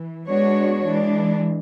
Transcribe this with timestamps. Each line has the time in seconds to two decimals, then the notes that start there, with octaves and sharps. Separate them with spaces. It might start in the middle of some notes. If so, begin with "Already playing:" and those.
Already playing: E3
0.28 G#3 B3 D4 F#4 C#5
0.84 E3 G#3 D4